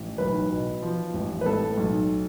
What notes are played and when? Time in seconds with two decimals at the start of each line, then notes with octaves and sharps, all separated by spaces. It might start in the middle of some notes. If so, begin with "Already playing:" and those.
Already playing: A1
0.18 B1 B4
0.50 B2
0.82 F3
1.14 A1
1.41 B4
1.46 A2 A4
1.77 B1